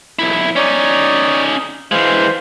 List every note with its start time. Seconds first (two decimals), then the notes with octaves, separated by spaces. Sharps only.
0.19 B1 E4
0.56 C#4 D#4 C#5 D5
1.92 E3 G#3 C5 F5